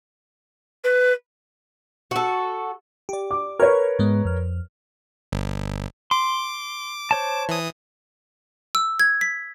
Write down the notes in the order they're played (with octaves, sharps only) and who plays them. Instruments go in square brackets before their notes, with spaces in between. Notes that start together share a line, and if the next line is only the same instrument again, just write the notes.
[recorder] B4
[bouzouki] F#4 A4
[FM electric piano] G4 D5
[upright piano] D6
[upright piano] A#4 B4 C#5 [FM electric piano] C#6 F6 G#6
[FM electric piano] G#2 G#3 B3
F2 F6
[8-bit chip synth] G1
[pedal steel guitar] C6 [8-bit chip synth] D6
[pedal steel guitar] C5 C#5 A5
[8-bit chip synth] E3 D#6
[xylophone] E6
G#6
B6